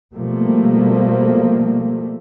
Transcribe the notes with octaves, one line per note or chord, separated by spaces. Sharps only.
B2 F3 G3 A3 A#3